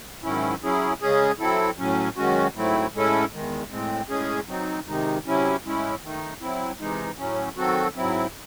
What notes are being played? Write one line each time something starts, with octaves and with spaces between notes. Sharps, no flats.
G#2 D#3 F#3 C#4 E4
F#3 C#4 E4 G#4
C#3 G#3 C#4 G#4
F#3 C4 E4 A4
A2 F#3 C#4
F#2 D#3 G#3 C#4 F#4
G#2 F#3 A3 C4 E4
A2 G#3 C#4 E4 A4
E2 D#3 G#3
A2 G#3 C4
A2 G#3 C#4 G#4
F#3 C4 D#4
C3 D#3 G#3 D#4
C3 F#3 C#4 E4
A2 G#3 C#4 E4
D#3 A3 D#4
F#3 C4 E4
C3 E3 G#3 D#4
A2 F#3 C#4
D#3 F#3 C4 F#4 A4
G#2 F#3 C4 E4